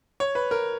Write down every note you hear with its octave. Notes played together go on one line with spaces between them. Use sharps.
C#5
B4
A#4